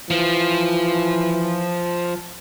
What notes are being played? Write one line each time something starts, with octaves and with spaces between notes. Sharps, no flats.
E3 F3